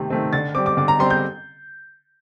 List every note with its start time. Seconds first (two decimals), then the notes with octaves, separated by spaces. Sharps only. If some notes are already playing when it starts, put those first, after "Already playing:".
Already playing: C3 D#3 A3 C4
0.10 D#3 A3 C4
0.33 D3 A6
0.55 G3 C4 D6
0.66 D6
0.77 D3 D6
0.88 A#5
0.99 G3 C4 C6
1.10 G6